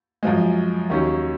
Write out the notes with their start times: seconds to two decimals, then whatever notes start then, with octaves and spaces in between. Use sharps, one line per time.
0.23 F#2 F3 G#3
0.90 D#2 D#3 F#3 C#4